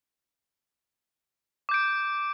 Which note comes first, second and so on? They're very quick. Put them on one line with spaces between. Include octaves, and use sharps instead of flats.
D6 G6 D7